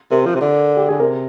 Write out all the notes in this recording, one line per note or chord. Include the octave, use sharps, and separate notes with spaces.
C3 A#4
F3
C3
D3
G4
D3 G#4
C3 A#4